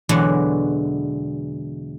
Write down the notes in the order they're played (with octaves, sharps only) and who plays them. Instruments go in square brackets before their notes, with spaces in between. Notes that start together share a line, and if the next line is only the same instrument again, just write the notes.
[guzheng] E2 B2 D3 E3 F#3 G#3